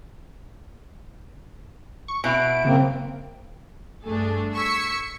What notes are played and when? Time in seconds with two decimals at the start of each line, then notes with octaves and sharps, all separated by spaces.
2.08 C#6
2.24 B2 E4 D7
2.65 F#2 C#3 A#3 C4
4.04 G2 A3 D4 G#4 A4
4.53 C#6 E6 G#6 B6 C#7